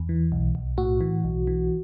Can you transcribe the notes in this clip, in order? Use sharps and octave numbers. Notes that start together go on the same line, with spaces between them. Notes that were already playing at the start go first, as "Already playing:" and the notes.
Already playing: E2
E3
B1
B1
A2 F#4
E3
B1
E3